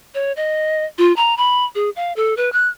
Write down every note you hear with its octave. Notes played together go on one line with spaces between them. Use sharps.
C#5
D#5
F4
A#5
B5
G#4
F5
A4
B4
F#6